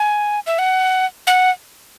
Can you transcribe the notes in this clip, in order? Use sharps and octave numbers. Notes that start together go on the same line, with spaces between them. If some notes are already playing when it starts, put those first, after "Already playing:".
Already playing: G#5
E5
F#5
F#5